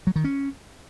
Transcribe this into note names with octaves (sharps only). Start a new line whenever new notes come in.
F#3
D#3
C#4